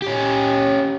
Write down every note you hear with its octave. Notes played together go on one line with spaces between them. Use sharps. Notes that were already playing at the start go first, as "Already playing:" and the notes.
C#4 G4